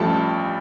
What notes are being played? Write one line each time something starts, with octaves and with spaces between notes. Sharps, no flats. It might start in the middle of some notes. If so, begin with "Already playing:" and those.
Already playing: A1 G2 F3 A3 A5